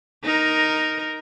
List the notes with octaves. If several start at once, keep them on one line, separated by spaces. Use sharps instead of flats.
D#4 A#4